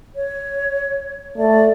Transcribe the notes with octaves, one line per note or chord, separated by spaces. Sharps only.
C#5
A3 D5